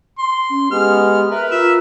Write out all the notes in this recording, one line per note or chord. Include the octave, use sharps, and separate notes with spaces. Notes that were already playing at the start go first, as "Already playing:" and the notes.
C6
C#4
G#3 B3 G4 F6
A#4 B4 E5
F4 E5